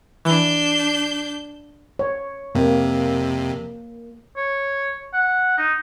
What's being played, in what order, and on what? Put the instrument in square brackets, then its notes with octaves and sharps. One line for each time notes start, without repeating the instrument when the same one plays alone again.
[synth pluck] E3 [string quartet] D4 G6
[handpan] C#5
[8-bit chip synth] F2 C3 [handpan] A#3
[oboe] C#5
F#5
D#4